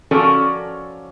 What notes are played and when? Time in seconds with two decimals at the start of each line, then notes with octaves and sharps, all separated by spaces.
0.11 F3 C#4 F#4 A4 A#4 D5